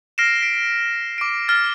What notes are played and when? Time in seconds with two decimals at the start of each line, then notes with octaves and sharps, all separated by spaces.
0.18 F6 A#6 C7 D7 E7
0.41 B6 D7
1.18 D6 D7
1.48 F6 A6